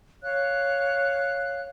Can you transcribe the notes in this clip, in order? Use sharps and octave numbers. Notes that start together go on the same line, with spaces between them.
C#5 F5 F#6